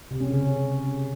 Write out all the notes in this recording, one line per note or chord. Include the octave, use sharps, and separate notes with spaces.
C3
C#4
C#3